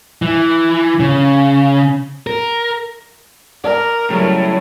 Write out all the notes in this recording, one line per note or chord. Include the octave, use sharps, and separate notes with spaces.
E3
C#3
A#4
A#4 D5
A2 C#3 F#3 G3